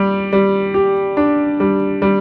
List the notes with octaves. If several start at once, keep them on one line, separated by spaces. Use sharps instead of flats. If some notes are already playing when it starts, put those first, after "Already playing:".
Already playing: G3 G4
G3
G4
D4
G3
G3